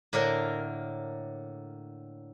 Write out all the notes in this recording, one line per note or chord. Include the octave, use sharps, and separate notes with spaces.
A2 D3 A#3 D4 A#4